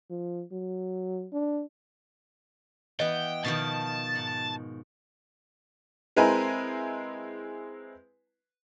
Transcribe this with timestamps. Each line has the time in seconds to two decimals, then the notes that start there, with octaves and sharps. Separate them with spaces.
0.10 F3
0.52 F#3
1.33 D4
3.00 E3 B3 D#5 G5
3.45 B2 D#3 F3 A5
4.15 G#2
6.16 G#3 C4 E4 A#4 B4 G#5